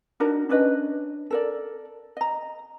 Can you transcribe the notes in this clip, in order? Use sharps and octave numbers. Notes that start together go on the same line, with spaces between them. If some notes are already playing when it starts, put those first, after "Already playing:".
D4 D#4 F#4 A#4
C#4 D4 B4 D#5
A4 A#4 D5
D#5 A#5